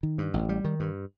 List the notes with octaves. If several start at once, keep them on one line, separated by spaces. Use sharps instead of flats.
D#3
G2
A1
G3
D#3
G2